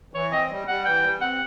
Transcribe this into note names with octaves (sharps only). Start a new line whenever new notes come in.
E3 C#5
C4 D#5
G3
G3 F#5
E3 G5
G3
C4 F#5